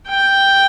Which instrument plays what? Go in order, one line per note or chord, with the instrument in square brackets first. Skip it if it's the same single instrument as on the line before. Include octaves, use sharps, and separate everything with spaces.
[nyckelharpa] G5